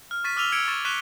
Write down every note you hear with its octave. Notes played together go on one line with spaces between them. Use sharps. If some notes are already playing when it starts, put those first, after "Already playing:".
F6
C#6 A6 B6 D#7
D6 E6 F6 D#7 F7 G7
E6 G#6 C#7 D7
C#6 A6
C#6 F#6 B6 D#7 F7 G7